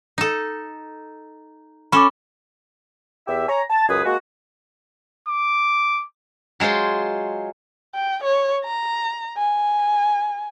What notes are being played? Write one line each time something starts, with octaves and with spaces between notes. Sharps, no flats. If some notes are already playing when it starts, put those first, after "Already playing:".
D#4 A4
C#4 A4 B5 D6
E2 G4 E5
C#5 G#5 A#5
A5
C#2 F#2 G#4 B4 D#6
G#3 A#3 F#4
D6
F#3 G#3 F4 C5
G5
C#5
A#5
G#5